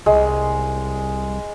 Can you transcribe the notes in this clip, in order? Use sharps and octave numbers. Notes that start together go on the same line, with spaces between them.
C2 G#3